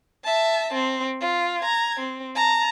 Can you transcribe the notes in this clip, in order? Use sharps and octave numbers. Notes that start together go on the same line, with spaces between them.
E5 A5
C4
F4
A#5 G#6
C4
A5 A#5